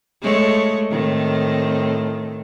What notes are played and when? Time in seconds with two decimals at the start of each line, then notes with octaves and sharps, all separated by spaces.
0.22 G#3 A3 C#5
0.90 A2 D#3 C4